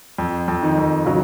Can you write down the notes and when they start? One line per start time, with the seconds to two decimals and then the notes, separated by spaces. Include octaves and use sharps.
0.18 F2
0.48 F2
0.62 D#3 D#4
0.78 F2
1.06 C#3 F#3 C#4